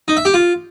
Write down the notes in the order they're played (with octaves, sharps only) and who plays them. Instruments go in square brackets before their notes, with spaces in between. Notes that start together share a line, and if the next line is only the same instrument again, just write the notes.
[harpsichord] D#4
E5
G4
F4